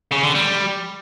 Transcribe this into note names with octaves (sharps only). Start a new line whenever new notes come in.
C#3
D3
G3